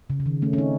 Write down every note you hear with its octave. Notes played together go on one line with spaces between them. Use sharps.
C#3
C#3
D#3
A3 C#4
C#4
C4 D#4